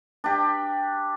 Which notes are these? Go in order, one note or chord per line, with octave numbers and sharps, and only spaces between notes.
D4 G4